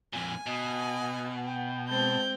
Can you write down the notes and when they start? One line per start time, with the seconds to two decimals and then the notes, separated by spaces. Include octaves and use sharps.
0.13 F2 A#2 G#5
0.46 B2 D#5
1.47 G5
1.89 G#3 C4 A5 G6